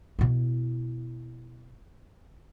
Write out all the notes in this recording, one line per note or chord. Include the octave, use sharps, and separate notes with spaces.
B2 E4